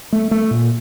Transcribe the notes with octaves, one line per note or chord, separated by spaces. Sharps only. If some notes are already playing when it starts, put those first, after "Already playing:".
A3
A3
A#2